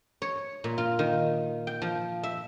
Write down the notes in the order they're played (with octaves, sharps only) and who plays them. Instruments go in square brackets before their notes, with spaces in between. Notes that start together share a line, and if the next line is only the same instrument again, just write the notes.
[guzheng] C#5
A#2
F4
D#3
G5
F3
E5